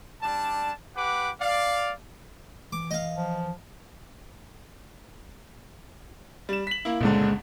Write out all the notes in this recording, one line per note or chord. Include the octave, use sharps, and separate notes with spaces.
G3 D4 A5
G4 B4 F#5 D6
D5 F5
E3 D6
D#5 F5
F3
G3 E7
B6 F#7
A#3 E4
G1 C#2 A#2 D3 G#3